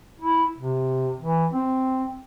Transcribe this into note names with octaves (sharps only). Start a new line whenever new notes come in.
E4
C3
E3
C4